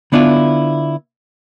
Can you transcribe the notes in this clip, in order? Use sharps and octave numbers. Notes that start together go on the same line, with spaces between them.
D3 B3 D4 E4 F4